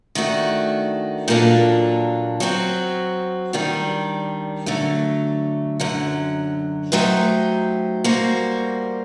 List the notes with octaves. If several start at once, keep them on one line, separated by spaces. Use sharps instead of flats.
D#3 A3 D4 F#4
A#2 F#3 A#3 D4 A4
F#3 C4 F#4
D#3 G3 D4
D3 F#3 A3
F#2 D3 F#3
F#3 A3 D#4 G4 C5
G3 A#3 F#4 C5